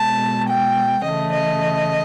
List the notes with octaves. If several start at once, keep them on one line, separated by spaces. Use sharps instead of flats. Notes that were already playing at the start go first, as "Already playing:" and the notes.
Already playing: B2 G#3 A5
G5
C#3 E3 A3 D#5
D#5